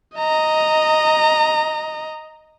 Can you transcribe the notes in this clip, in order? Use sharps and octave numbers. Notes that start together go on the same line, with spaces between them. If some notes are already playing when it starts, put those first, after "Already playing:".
D#5 A#5